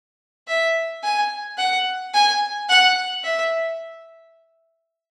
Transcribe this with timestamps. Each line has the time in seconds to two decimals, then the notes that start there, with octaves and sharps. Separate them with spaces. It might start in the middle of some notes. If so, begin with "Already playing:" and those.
0.48 E5
1.03 G#5
1.58 F#5
2.14 G#5
2.69 F#5
3.24 E5